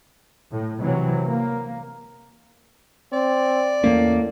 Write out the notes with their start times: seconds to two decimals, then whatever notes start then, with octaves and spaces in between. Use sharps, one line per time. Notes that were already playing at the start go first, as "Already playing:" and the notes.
0.51 A2
0.83 C3 E3 F#3
1.28 A#3
3.13 C4 D5
3.84 E2 A2 A3 A#3 C#4